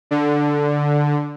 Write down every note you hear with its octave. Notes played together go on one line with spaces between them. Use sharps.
D3